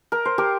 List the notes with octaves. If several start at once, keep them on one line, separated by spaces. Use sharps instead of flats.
A#4
C5
G4 A#4